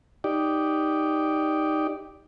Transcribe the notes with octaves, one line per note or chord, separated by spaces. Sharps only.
D#4 G4 D5